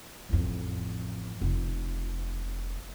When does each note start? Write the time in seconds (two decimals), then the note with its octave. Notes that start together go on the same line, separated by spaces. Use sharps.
0.29 A1 F2
1.41 F1